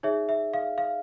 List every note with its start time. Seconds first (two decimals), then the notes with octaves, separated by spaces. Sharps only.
0.03 D#4 G#4 C#5 E5
0.29 E5
0.54 F5
0.78 F5